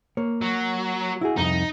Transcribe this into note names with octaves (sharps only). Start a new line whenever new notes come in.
A#3 C#5
F#3
E4 F#4 G#4
C2 F2 D#4